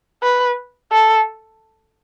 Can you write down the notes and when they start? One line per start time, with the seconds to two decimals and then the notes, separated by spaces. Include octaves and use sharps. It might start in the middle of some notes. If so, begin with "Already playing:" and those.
0.23 B4
0.92 A4